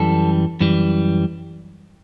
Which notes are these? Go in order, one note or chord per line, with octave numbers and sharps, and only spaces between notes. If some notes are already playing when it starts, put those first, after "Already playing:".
Already playing: F#2 E3 G3 A4
F#2 E3 G3